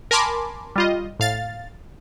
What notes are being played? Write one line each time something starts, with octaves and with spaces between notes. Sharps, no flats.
A#4 G#5 A5 B5 C6 D6
G3 F4 D#5
A2 F5 A6